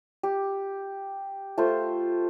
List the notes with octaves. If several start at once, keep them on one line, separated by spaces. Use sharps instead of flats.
G4
A3 F4 C5